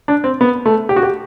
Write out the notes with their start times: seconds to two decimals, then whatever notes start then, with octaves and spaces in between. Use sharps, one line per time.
0.08 D4
0.24 C4
0.41 B3
0.66 A3
0.89 G4
0.96 F#4
1.03 G4